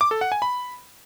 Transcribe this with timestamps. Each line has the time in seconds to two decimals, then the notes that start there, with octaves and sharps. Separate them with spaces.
0.01 D6
0.11 A4
0.21 F#5
0.32 G#5
0.42 B5